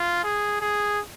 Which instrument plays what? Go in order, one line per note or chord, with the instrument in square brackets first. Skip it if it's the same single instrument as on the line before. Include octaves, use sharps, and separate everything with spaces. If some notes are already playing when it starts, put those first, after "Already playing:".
Already playing: [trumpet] F4
G#4
G#4